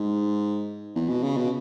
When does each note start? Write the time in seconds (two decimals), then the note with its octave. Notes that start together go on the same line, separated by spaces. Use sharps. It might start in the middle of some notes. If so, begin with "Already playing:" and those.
Already playing: G#2
0.95 E2
1.09 B2
1.24 C#3
1.37 B2